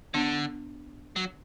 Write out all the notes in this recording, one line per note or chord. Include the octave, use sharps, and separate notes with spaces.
D3 B3 D4
F#3